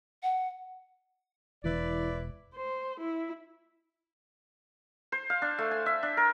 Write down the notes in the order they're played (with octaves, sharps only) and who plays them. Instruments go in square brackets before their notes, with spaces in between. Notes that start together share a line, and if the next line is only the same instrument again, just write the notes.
[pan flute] F#5
[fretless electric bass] E1 [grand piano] E3 [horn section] E4 B4 D5
[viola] C5
E4
[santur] C5
F5
D4
A3
G#5
E5
D4
A#4